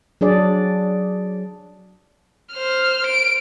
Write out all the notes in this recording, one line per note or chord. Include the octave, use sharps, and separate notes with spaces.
F#3 D4 G#4 D5
C5 F6
D7